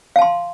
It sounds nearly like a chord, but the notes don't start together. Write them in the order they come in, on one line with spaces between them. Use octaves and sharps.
F5 A5 C6